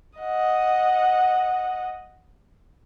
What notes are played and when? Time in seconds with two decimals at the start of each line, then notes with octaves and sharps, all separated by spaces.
0.19 D#5 F#5